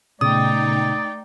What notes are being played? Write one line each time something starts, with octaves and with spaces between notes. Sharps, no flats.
A#2 C#3 A3 B3 D#4 D5 G5 D#6